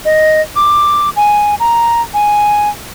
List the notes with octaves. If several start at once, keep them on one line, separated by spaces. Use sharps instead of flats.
D#5
D6
G#5
A#5
G#5